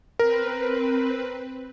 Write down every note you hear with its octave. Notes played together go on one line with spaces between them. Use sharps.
C4 A#4 B4